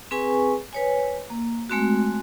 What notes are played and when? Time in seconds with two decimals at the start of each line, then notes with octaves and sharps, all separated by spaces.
0.11 C4 G#4 B4 G#5 C#6
0.73 B4 C#5 G#5
1.30 A#3
1.70 G#3 A3 C4 F#4